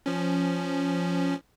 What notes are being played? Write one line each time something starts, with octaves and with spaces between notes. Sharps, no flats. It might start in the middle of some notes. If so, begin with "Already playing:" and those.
F3 C#4